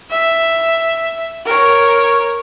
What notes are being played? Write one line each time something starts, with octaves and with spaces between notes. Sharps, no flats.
E5
A#4 C#5